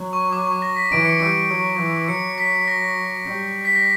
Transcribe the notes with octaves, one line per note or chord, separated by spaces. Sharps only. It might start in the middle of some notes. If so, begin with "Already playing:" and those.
Already playing: F#3
C#6
D6
C#6
A#6
B6
E3 D7
C#7
G3 D7
F#3
E3
F#3 C#7
B6
A#6
G3
B6
A#6